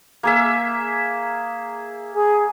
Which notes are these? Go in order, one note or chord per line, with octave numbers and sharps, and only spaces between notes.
A#3 G#4 E5
G#4 G#5